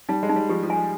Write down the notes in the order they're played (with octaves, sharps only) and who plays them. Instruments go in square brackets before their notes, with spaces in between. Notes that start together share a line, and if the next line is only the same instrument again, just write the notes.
[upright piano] G3 [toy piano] D#4
[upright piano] G#3
[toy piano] D#4
[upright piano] G3
[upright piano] F3 [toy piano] G4
[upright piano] F3
[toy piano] G#5
[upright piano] G#3